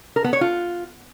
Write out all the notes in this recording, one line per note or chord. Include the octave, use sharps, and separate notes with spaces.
A#4
B3
C#5
F4